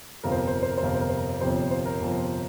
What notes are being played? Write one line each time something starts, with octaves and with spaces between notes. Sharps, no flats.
G1 F2 C3 F3 A#4
C5
A#4
C5
A#4
C5
A#4
C5
G1 F2 C3 F3 A#4
C5
A#4
C5
A#4
G1 F2 C3 F3 C5
C#5
C5
A#4
G1 F2 C3 F3